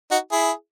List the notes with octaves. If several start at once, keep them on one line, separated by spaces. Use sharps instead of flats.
D#4 F#4
E4 G#4